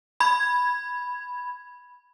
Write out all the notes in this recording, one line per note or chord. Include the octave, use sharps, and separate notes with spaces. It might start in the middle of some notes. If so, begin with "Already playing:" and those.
B5 G#6